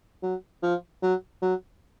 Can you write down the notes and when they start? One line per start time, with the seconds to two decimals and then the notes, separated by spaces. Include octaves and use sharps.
0.23 F#3
0.63 F3
1.02 F#3
1.42 F#3